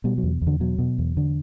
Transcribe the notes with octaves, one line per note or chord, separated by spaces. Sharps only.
B2 G3
F#3
E2
E2
D3
B2 F#3
B2
E2
D3